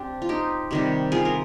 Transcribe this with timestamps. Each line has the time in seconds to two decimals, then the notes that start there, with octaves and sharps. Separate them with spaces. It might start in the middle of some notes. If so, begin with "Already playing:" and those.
Already playing: C4 D4 G4
0.22 F4
0.29 D#4 G4
0.71 C3 D#3 G3
1.12 F4 G#4
1.25 A#4